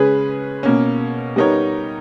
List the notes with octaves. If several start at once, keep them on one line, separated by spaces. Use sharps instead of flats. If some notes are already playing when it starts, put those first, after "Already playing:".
Already playing: C#3 G#3 C#4 G#4 B4
B2 A#3 C#4
G3 B3 D#4 A#4 C#5